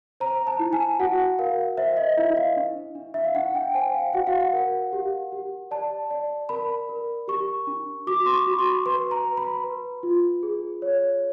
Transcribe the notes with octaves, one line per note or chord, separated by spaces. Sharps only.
C5 A#5
A5
E4
G#5
F#4 F#5
A#4 F5
C5 E5
D#5
E4 E5
F5
D4
D4
E5
F5
D4 F#5
G5
C5 G#5
F5
F#4 F#5
F5
F#5
A#4
G4
G4
D5 A5
D5
A#4 B5
A#4
G4 C#6
D4
F#4 D6
C6
C#6
F#4
B5
C6
B4 C6
A#5
B4
B5
B4
F4
G#4
C#5